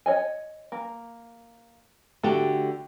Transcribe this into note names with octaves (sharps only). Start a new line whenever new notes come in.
C#5 D#5 G#5
A#3
D3 A3 F#4 G4